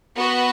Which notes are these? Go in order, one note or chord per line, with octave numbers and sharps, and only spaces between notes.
B3 F#4 B4